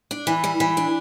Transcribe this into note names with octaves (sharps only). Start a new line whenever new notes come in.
D4
E3
G3
E3
D4